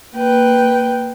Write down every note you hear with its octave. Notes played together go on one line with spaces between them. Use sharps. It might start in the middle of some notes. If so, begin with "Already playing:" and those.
A#3 B4 G5